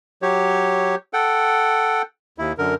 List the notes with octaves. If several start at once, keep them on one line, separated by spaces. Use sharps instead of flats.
F#3 G4 C#5
A4 F#5 G5
D#2 E4
F#2 D3 A#4